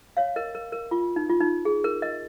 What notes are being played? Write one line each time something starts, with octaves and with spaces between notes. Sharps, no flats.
C#5 F5
A#4 D#5
A#4
A#4
F4
D#4
F4
D#4
G#4
A#4
A#4 D#5